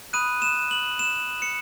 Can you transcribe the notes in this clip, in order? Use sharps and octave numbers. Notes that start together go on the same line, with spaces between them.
B5 D#6 F#6 D#7
E7
F#7
E7
C#7